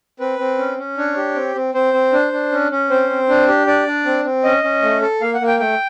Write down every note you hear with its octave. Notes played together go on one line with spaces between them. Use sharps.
C4 B4
C4
C#4
C#4
D4 C#5
G4
C4
C4
C4 C5
C4
D4
D4
C#4
C#4
C4 C5
C4
D4
G4
D4 D5
D4
C4
C4
C#4 D#5
C#4
A3
A4
A#3 F5
F#5
A#3
G5
A3 G5